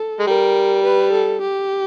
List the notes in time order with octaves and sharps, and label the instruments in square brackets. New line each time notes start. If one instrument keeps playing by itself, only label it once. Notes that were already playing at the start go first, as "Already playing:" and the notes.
Already playing: [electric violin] A4
[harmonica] G#3
[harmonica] G3 [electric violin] A#4
[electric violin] B4
A4
G4